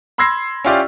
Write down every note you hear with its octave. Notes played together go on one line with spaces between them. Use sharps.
B5 C6 E6 G#6 A#6 C7
C#4 E4 F4 G4 D5